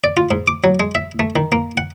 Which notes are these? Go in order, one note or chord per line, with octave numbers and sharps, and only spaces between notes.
D5
F4
G#2
D6
F#3
G#3
E5
A3
D#3
A#3
F#5